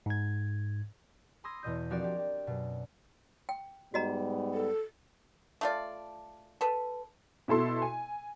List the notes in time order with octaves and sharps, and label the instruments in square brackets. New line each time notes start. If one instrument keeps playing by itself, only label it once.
[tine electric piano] G#2 G#6
[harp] B5 C6 D#6 E6 G#6 A#6
E2 B2 D#5 G6
F3 C4 F#4 G4 A#4 D5
D4 G4
G4
F#2 B2
[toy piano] G5
[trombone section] G#2 G3 B3 [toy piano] F#4 D#5 A#5
[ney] A4
[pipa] A3 F4 D5
A4 B4
[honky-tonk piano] B2 E4 A4 C6
G#5